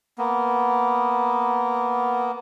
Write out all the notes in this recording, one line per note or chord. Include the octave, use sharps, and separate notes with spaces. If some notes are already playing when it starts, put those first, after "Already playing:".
A#3 B3